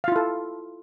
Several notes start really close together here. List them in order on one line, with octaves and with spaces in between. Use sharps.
F5 F4 E4 A4